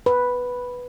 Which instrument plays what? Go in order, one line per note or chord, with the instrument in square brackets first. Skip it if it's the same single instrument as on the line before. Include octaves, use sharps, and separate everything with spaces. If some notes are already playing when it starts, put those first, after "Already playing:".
[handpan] B4